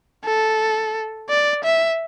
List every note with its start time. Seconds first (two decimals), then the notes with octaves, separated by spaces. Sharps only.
0.24 A4
1.29 D5
1.64 E5